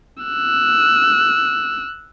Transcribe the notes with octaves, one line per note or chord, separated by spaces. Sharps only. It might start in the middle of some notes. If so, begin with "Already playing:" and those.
E6 F#6